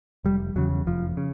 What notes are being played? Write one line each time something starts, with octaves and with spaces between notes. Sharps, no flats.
F1 G3
E2 C#3 F#3
F1 F3
C#3